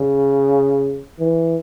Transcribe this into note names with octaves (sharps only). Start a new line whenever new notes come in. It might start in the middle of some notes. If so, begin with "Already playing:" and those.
Already playing: C#3
E3